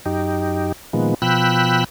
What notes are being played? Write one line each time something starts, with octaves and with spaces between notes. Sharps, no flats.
F#2 D#4 G4
A#2 D#3 F3 G#3 B3
B2 F3 G5 B5 E6 F#6